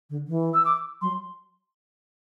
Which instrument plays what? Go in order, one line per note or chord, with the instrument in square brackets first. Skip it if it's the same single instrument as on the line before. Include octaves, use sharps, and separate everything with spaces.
[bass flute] D3
E3
[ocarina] E6
D6
[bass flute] F#3 [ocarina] C6